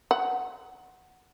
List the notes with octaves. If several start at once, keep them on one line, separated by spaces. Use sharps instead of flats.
F#5